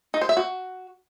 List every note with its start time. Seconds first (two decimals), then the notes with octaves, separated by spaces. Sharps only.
0.14 D#4
0.21 C5
0.29 E5
0.37 F#4